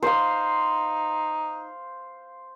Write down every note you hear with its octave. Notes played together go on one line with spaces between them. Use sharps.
D#4 C5 F5